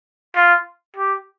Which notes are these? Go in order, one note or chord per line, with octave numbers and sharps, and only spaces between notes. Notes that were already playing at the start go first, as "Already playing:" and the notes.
F4
G4